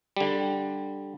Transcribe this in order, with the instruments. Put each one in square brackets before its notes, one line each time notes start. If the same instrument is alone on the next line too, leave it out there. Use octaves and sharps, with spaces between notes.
[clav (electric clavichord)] D3 G3